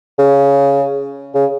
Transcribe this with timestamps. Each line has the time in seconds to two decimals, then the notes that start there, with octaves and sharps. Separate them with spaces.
0.19 C#3
1.35 C#3